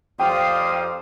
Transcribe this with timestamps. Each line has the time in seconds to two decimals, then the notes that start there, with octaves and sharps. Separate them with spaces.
0.20 F2 G4 C5 D5 F5 G5 D#6